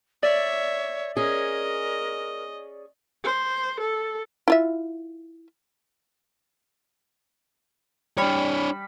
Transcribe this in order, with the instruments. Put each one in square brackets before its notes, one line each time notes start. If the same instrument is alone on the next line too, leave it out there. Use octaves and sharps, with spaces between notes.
[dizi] C#5 [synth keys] D5 [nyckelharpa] E5
[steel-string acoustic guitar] C#4 G#4 [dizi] A#4 [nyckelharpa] D#5
[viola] C5
A4
[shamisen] E4 F4 E5
[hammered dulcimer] G3 B5 [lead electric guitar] D4 C#5